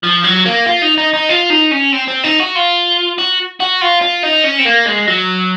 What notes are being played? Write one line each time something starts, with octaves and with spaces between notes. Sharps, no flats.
F3
F#3
A#3
F4
D#4
D#4
D#4
F4
D#4
C#4
C4
C4
D#4
F#4
F4
F#4
F#4
F4
F4
D#4
C#4
C4
A#3
G#3
F#3